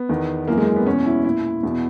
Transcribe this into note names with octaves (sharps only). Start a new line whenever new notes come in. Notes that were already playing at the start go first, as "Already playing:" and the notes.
Already playing: B3
E2 D#3
F#2 E3 A#3
G#3
A#3
B3
E2 B2 C#4
E4
A#2 E4
E2 B2